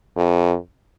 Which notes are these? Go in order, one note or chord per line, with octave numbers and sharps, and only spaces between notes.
F2